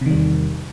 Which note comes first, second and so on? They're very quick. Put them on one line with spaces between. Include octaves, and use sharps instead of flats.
C3 D#3 G3 E2